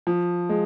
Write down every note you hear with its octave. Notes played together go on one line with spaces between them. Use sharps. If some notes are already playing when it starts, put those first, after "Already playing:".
F3
G#3